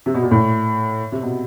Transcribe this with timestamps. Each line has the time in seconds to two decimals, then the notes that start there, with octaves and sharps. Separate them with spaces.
0.06 C3
0.14 B2
0.23 A#2
0.31 A2
1.12 C3
1.23 B2